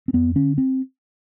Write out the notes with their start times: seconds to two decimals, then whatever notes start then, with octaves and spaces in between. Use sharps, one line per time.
0.08 C4
0.13 F2 B3
0.36 D3 C#4
0.58 C4